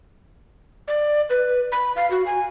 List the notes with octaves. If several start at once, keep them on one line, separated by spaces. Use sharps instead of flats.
D5
B4
B5
F5
F#4
G#5